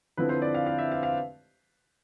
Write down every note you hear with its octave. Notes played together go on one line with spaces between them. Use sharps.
D3 F3 C4 E4 B4
C5
D5
F5
F5
E5
F5
F5